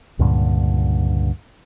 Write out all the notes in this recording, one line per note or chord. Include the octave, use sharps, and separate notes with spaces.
C#2 G2 A#2 D3